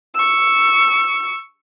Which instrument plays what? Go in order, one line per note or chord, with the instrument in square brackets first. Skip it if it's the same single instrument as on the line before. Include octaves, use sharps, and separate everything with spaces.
[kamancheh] C#6 E6